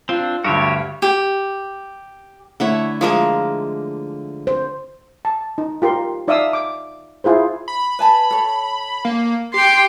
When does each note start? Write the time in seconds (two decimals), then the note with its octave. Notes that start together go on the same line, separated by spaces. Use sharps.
0.09 C4 D4 F4
0.44 D2 G2 F#4 G4 C#5
1.02 G4
2.60 D3 A3 E4 C#5 E5 F#5
3.01 F3 G#3 A#3 F4 A#4
4.47 C5
5.25 A5
5.58 D#4
5.82 F4 G4 A#4 C6
6.28 D#4 D5 E5 F5 D#6 E6
6.53 D6
7.24 E4 F4 G#4 C5
7.68 B5
7.99 B4 G#5 A5
8.31 A4 C#5
9.05 A#3
9.54 G4 G5 C6